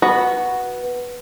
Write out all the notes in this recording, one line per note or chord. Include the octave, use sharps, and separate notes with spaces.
B3 F#4 B4 B5